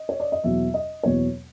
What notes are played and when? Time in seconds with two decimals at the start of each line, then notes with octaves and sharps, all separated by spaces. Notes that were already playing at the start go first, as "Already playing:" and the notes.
Already playing: D#5
0.09 C#5
0.20 D5
0.32 D#5
0.44 E2 B2 F#3 E5
0.74 D#5
1.03 E2 B2 F#3 C#5